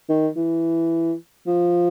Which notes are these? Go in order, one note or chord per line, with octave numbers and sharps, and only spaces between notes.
D#3
E3
F3